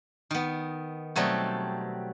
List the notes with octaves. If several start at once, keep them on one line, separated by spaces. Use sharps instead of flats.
D#3 B3
B2 F#3 G3 A3 C4